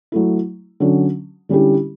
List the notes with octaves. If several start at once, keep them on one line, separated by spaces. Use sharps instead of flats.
F#3 A3 E4
D3 F#3 C#4
D3 G3 C#4 E4 G4